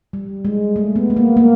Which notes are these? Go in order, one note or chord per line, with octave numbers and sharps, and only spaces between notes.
G3
G#3
A3
B3
B3
A#3
A#3